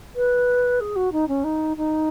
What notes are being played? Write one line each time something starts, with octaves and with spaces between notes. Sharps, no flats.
B4
G#4
F#4
D#4
C#4
D#4
D#4